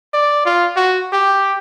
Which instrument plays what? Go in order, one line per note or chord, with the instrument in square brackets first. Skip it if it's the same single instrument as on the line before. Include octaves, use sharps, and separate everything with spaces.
[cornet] D5
F4
F#4
G4